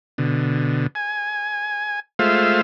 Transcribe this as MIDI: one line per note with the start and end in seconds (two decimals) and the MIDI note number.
0.18 0.87 47
0.18 0.87 50
0.95 2.00 80
2.19 2.61 56
2.19 2.61 57
2.19 2.61 65
2.19 2.61 72
2.19 2.61 76
2.19 2.61 77